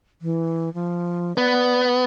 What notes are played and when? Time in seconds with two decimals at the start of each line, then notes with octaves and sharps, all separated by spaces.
0.22 E3
0.74 F3
1.37 B3 D5